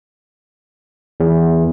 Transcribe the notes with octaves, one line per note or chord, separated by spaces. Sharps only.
E2